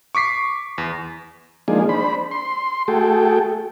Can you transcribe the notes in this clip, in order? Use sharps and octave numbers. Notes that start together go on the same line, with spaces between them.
C#6 D6 B6 C7
E2
F3 G#3 A#3 D4 D#4 G#4
D4 C5 B5
C6
A3 F#4 G#4 A4 G5